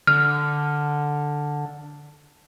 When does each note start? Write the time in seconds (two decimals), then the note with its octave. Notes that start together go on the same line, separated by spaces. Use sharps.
0.07 D3 F6